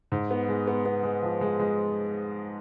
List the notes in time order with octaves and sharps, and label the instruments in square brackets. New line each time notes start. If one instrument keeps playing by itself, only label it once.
[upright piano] G#2
B3
G#3
B3
B3
G#3
F3
G#3
G#3